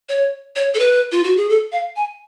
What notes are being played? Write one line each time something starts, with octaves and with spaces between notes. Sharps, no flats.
C#5
C#5
A4
B4
F4
F#4
G#4
A4
F5
G#5